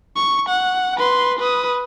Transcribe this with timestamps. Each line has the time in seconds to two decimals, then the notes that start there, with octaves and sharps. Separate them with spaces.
0.16 C#6
0.49 F#5
0.97 B4 C6
1.39 B4 D#6